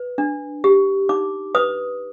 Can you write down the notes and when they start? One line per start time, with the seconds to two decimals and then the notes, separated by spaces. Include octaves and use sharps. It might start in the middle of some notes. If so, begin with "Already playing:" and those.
Already playing: B4
0.18 D4
0.64 G4
1.09 D#4 D6
1.55 B4 D#6